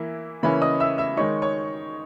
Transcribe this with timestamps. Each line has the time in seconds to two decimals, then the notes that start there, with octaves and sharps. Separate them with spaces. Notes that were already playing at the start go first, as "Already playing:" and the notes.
Already playing: E3 A#3 E4
0.43 C#3 E3 A#3 C#4 E4 B4 B5
0.61 D#5 D#6
0.80 E5 E6
0.98 E5 E6
1.17 D#3 G#3 D#4 C#5 C#6
1.42 C#5 C#6